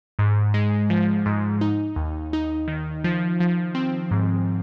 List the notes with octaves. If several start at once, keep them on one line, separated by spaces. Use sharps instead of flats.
G#2
G#3
F3
G#2
D#4
D#2
D#4
D#3
F3
F3
C4
G#2